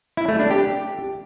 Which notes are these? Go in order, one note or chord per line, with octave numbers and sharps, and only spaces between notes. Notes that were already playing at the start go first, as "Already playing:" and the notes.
E4
A3
D4
G4